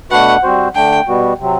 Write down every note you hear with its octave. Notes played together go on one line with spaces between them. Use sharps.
B2 A3 D4 F#4 B4 F#5
G3 C4 F#4 C5
D3 A3 D4 G5
B2 G3 B3 F#4
C3 F#3 C4